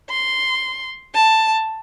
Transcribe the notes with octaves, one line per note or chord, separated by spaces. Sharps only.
C6
A5